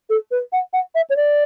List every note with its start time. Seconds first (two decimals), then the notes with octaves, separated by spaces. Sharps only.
0.09 A4
0.31 B4
0.52 F#5
0.73 F#5
0.95 E5
1.09 C#5
1.16 D5